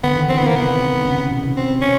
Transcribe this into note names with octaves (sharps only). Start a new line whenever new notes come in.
D3 B3
D#3
E3 C4
B3
D#3
A#3
C3 B3
C3
C#3
C#3
B2
C3
C4
C#4